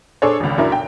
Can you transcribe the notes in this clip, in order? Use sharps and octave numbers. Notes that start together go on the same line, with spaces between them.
D4 G#4 A4 C5 C#5
G#1 C#2
F#2 D4 E4 A#4
G5